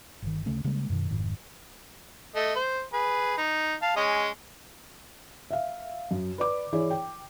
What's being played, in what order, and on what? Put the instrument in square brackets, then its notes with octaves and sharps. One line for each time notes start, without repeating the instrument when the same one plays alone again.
[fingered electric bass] G1 D#3
D2 C#3 A3 C#4
C#3 G3 G#3 A#3
F#2 B2 D#3
F1 G#2 D#3
[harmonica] A3 D#5
C5
G#4 B4
D#4
F5 A5
G#3 C#4 D#5
[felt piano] E5 F5
F#2
B4 D5 D6
E3 E4 G#4 C#5 D5
G5